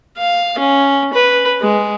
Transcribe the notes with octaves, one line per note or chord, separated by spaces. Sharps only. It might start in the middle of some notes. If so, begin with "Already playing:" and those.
F5
C#4
B4
G#3